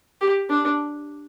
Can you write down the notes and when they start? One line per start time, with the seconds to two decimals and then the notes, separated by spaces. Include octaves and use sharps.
0.21 G4
0.50 D4